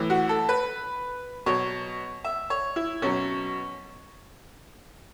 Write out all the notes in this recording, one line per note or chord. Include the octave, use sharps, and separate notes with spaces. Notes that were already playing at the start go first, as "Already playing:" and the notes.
Already playing: A2 E3
F#4
A4
B4
B2 F#3 C#5
E5
C#5
E4
B2 F#3 C#4